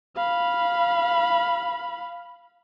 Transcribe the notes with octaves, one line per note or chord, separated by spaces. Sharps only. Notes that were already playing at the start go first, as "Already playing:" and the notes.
F5 B5